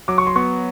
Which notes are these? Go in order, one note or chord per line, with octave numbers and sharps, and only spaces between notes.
F#3 D6
C#6
C6
B3 C#6